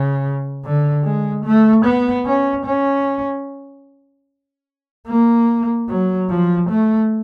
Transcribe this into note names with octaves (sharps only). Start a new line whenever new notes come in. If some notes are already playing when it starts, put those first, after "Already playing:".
Already playing: C#3
D3
G#3
A3
B3
C#4
C#4
A#3
F#3
F3
A3